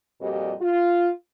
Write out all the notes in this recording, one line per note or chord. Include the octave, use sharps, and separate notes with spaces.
F2 A#2 G3 F#4 G4 D#5
F4